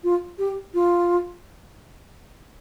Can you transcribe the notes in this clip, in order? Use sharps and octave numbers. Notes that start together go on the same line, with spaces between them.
F4
G4
F4